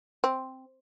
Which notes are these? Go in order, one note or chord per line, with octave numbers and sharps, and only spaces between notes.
C4